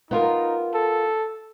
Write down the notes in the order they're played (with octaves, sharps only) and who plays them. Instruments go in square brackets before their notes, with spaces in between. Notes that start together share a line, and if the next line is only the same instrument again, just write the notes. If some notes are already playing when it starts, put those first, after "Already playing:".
[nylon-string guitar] B3 F4 A#4 [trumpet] D#4
[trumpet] A4